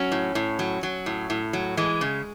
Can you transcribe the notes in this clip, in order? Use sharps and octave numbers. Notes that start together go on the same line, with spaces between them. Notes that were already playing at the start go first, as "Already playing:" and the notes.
Already playing: F#3 C#4
A2
A2
F#3
F#3
A2
A2
F#3
E3 G#3
C#3